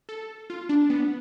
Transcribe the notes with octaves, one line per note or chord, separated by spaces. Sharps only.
A4
F4
D4
B3